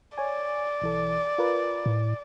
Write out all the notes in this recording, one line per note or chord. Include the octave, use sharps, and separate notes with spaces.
C#5 D5 G#5
B1 E3 A4
F4 A#4 B4
A2